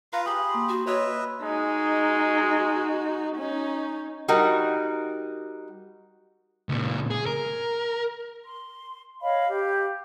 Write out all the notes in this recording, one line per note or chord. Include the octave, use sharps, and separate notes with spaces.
F4 B4 F5 A#5
G4 G#4 B5
A#3 C6
F#4
B4 C#5 D#5 E5
G#3 D#4 F#4
C#4 D#4
G3 D#4 F#4 A#4
C#2 A#2
G#4
A#4
C6
C#5 D#5 F5 B5
G4